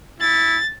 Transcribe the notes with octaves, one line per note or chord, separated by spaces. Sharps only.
E4 A6